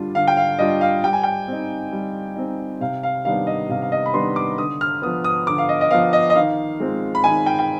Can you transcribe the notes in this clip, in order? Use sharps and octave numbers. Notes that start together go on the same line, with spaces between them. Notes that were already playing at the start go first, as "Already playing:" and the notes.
Already playing: D3 G3 D4 F4
D3 F5
G5
F5
G3 D4 F4 D#5
F5
G3 G5
G#5
G5
C4 D#4
G3
C4 D#4
C3 F5
F5
D#3 G3 B3 D4 F5
D#5
C3 F5
F5
D#5
B5
D#3 G3 B3 D4 C6
D6
D3 D#6
F6
F3 B3 D#6
D#6
D3 D6
F5
D#5
D#5
F3 B3 F5
D#5
D#5
D#3 F5
G#3 C4 F4
B5
D#3 G#5
G5
G5